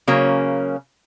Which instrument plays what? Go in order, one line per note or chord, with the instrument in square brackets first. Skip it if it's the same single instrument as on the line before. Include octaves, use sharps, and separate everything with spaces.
[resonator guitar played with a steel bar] C#3 F#3 A#3 C#4